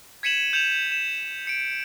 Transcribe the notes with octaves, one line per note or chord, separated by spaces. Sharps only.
G#6 B6 C#7 D#7 E7 F#7
G6 C#7 E7 F7
E7
C#7 D7